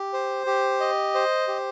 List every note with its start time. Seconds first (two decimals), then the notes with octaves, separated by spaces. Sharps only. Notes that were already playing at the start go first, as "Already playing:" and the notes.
Already playing: G4
0.13 C5
0.47 G4
0.80 D#5
1.15 C5
1.48 G4